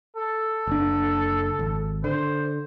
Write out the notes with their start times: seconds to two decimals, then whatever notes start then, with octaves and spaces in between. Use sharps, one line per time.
0.17 A4
0.67 F#1 D4
1.59 G#1
2.04 D3 C5